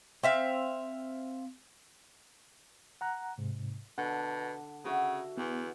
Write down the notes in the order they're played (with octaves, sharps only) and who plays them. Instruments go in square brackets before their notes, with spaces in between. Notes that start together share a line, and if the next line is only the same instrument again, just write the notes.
[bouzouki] C4 E5 F5
[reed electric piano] F#5 A#5 F#6
G#2 C3
[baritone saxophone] B2 [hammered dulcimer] D3 [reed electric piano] F#5
[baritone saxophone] C#3 [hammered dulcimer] F#4 E5
[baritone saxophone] E2 [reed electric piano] B3